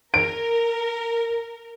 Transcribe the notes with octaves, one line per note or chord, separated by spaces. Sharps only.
A#4 D7